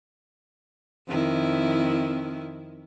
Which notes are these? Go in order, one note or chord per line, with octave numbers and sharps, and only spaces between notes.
F2 D#3 E4